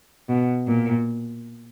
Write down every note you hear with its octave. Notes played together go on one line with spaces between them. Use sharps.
B2
A#2